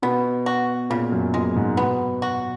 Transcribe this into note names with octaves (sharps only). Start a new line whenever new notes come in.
B2 B3
F#4
A#2 C#3
F#2
A#2 G#3
G#2
B2 B3
F#4